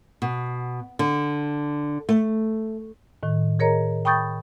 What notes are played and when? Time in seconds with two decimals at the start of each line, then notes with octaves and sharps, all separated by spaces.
0.22 B2
0.99 D3
2.09 A3
3.23 A2 D#3
3.59 G#4 A#4 C#5 D#5 A#5
4.05 G5 B5 C#6 D#6 G6 A6